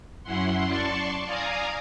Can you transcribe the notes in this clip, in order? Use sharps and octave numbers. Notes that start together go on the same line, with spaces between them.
F#2 C#4 E4 F#5 C6
D5 A5 C6 C#6
D5 F5 G#5 A#5 D#6